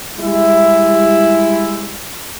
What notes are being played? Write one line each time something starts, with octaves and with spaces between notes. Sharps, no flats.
G3 G#3 E4